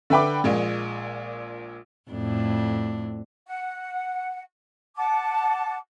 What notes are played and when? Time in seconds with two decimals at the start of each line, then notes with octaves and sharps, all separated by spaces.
0.10 D3 B4 E5 G5 B5 D6
0.44 A#1 A#2 G#3
2.11 F2 A2 D4
3.47 F#5
4.96 F#5 A5 D6